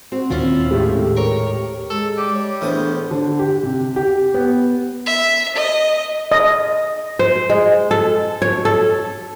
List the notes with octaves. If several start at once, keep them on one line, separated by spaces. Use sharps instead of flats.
C4 F#4
D#2 A#2 D#3 C4 C#4 E4 F4
A2 G#3 A3 G4
A#4 C#5
G#3 A4
G3 D6
C#5
E2 A2 D4 C5 D#6
D3
G4
C3
G4
B3
E5
D#5
D#5
C5
G#3
A4
C#5
A4